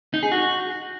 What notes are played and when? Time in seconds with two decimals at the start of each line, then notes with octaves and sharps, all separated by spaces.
0.14 D#4
0.23 G#4
0.32 F#4